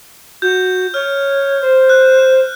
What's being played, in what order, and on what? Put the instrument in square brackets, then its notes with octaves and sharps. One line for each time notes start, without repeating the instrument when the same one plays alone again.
[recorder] F#4 [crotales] G6
[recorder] C#5 [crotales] F6
[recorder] C5
[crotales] F#6